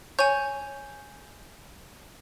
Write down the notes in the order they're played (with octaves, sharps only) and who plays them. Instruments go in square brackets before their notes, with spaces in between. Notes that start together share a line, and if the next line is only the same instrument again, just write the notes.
[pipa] C#5 [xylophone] G#5 G6